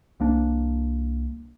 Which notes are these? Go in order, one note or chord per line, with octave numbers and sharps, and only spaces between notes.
C2 A#3 D4